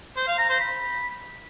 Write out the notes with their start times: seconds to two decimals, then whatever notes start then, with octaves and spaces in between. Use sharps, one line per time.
0.16 C5
0.27 F5
0.38 A#5
0.49 C5
0.60 B5